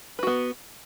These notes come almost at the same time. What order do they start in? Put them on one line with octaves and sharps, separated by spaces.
B4 F#4 B3